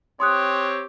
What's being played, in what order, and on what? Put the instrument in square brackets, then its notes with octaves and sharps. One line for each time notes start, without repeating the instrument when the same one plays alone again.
[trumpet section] C4 G4 C#5 [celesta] C6 D#6 F#6